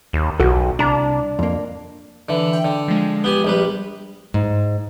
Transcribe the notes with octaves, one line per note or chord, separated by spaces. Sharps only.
D#2
B1 F#4 A4
C2 D4 A#5
F2 A#3
D3 E3
G5
D3
F3 G#3
B3 G4 G#5
A#1 G3 B4
G#2